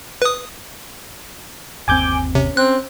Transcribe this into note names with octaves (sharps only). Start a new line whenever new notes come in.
B4 D#6
G1 D#2 C4 G#5 D6 G6
C3 C#4
C4 F#6